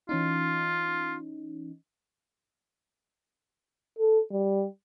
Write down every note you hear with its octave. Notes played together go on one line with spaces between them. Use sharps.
E3 C#4 D#4 F4
A4
G3